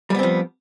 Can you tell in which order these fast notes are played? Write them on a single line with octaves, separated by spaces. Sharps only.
G3 B3 C4 F3